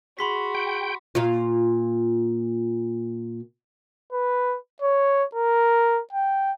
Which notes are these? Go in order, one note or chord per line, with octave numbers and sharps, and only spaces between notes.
F#4 G#4 B5 C6 B6
G5
A#2 F4
B4
C#5
A#4
G5